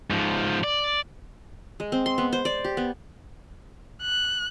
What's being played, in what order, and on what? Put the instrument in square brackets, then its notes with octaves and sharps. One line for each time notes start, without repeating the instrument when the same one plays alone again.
[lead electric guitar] G#2 F3
D5
[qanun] G#3
C4
C6
B3
C5
D5
G4
B3
[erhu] F#6